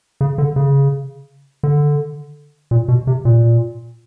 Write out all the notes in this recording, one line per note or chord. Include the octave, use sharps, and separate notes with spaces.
C#3
D3
C#3
D3
A#2
B2
C3
A#2